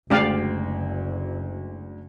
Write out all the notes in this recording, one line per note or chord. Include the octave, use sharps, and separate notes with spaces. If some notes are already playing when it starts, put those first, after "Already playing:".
F#1 D2 G#3 G4 D5 F5